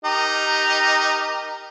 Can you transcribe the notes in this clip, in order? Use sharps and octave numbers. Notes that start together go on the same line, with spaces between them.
D#4 G4 A#4